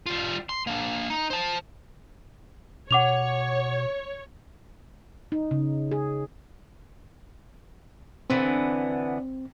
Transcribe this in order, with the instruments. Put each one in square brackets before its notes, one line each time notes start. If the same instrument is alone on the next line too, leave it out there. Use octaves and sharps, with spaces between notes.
[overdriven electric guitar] G3 F4
C6
A#3 D4
D#4
C5 A5
[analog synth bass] B2 [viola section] C#5 [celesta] F#5 D6 F7
[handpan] D#4
C#3
G#4
[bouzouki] D3 E3 B3 [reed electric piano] C4